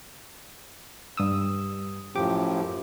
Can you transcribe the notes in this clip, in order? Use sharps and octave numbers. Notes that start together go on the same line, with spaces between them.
G2 D#6 E6
F#2 A2 F3 G4 D6